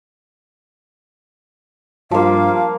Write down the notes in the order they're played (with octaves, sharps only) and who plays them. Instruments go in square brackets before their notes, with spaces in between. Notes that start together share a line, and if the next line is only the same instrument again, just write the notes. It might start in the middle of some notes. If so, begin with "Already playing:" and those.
[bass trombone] G2 [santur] F3 A#3 [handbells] F4 [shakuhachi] F5